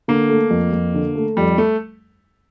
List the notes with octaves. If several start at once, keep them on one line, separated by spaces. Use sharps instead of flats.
D3 A#3
A3
F2
F2
D3
A3
F2 G3
A3